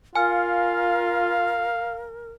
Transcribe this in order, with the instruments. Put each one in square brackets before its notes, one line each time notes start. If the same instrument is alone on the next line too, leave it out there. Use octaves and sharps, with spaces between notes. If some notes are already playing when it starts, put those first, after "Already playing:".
[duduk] F4 [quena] A#4 [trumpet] F5 [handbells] G#5 F6